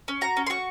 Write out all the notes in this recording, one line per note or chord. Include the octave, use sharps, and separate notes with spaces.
C#4
F#4 A#5
C#4
C6
F#4 C#6